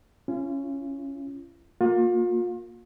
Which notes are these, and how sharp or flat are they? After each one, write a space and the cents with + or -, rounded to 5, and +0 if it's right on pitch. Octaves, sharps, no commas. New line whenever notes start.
C#4 +0 F4 -40
A#3 +0 F4 +35